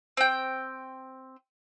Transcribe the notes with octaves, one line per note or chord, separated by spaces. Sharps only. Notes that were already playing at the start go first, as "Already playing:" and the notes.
C4 G5